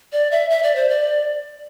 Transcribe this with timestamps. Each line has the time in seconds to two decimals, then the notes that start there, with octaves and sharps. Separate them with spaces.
0.13 D5
0.31 E5
0.50 E5
0.63 D5
0.76 C5
0.89 D5